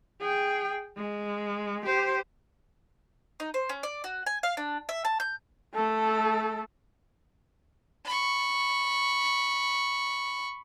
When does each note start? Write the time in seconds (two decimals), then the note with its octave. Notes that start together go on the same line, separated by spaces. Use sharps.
0.21 G#4 G5
0.97 G#3
1.86 G4 C5
3.40 D#4
3.54 C5
3.69 C#4
3.83 D5
4.04 F#4
4.26 G#5
4.43 F5
4.57 D4
4.89 E5
5.05 A5
5.20 G6
5.74 A3 A4
8.05 B5 C#6